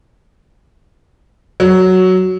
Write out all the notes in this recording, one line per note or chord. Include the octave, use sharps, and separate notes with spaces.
F#3